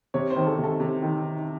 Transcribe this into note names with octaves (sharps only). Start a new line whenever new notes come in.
C3 C#5
C5
D#3
A4
C3
A4
C3
D#3